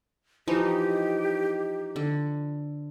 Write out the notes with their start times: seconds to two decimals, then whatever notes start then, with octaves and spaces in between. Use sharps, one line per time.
0.48 E3 F3 D#4 G4
1.96 D3